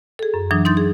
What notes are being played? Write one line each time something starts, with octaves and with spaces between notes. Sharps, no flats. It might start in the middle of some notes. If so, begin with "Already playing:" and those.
G#4 A4
F#2
E3 F#3 D4 D#6
D#4 C6 D#6 G6 A6
G#4